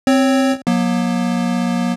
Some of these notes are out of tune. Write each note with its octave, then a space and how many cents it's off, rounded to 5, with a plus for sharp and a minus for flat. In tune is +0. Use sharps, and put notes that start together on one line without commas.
C4 +0 C#5 +0
F#3 -30 A#3 +40